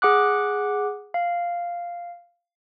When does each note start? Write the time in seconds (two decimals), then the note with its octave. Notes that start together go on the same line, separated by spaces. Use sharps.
0.02 G#4 F#5 D6 F#6
1.14 F5